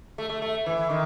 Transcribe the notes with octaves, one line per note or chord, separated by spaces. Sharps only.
A3
A3
A3
E3
D#3